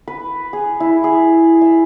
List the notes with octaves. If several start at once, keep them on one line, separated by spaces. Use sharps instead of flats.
B4
G#4
E4
G#4
E5